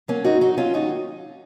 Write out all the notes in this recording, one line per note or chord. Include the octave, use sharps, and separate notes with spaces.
F#3 A#3 C#4
G#2 D#4 F#4
F#3 D#4 F#4
F#3 C#4 F4
D#2 D#4 F#4